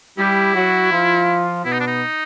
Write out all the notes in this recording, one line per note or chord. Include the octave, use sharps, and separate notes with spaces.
G3 E4 G4
F#3 F#4
F3 F4
B2 B3 E4
D#4
D4
D#4